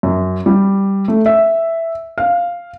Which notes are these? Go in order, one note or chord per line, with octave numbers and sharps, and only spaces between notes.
F#2
G3
A3
E5
F5